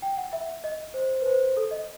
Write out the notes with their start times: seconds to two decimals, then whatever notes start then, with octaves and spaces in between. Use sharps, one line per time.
0.02 G5
0.17 F#5
0.33 E5
0.64 D#5
0.94 C5
1.21 B4
1.26 C5
1.57 A4
1.71 D#5